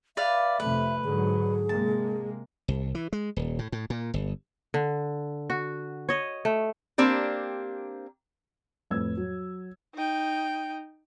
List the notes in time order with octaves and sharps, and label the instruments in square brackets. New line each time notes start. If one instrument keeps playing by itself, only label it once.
[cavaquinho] B4 D5 F5 [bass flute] E5
[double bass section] F2 C3 A3 [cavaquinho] B4
[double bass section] G#2 D3 F#3 [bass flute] G#4
[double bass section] C3 G#3 A#3 [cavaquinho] A5
[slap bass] C2
E3
G#3
D#1
A2
A2
A#2
G1
[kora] D3
F#4
C#5 D#5
A3
[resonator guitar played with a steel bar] A#3 C4 D4 G4
[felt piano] F2 A2 B4 E6 G#6
F#3
[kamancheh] D#4 G5